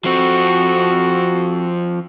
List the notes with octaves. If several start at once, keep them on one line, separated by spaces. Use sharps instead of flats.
F3 C4 F#4